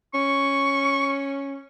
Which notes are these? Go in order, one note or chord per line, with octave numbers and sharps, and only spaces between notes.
C#4 C#6